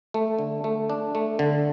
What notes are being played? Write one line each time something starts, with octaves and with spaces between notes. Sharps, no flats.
A3
D3
A3
D4
A3
D3